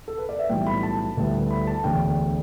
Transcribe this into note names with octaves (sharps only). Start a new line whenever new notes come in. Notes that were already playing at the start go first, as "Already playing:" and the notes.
A4
B4
D5
E5
B1 A2 E3 G3 G5
B5
A5
D2 D3 G3 B3 E4
B5
A5
E1 D2 D3 G5